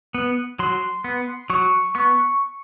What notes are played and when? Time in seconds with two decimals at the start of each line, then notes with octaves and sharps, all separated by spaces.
0.14 B3
0.59 F#3 C6
1.04 B3
1.50 F#3 C#6
1.95 B3 C#6